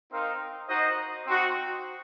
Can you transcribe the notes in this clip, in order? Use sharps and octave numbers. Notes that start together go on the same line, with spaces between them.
C4 D#4 A#4 F5
D#4 F#4 C5 D#5
C4 D#4 F#4